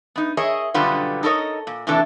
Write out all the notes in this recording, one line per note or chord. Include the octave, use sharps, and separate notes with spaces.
B3 D#4
G#4 A#4 C#5 D#5 E5
F#2 B2 D3 G3 B3 F4
D#4 A4 A#4 C#5 D#5
A#2
A2 C3 E3 D4 A4